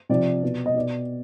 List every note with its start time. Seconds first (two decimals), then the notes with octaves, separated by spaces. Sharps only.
0.09 C3 F3 D5
0.43 B2
0.66 D#5
0.76 B2 D5